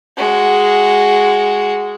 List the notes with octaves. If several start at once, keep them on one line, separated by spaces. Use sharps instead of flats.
G#3 F#4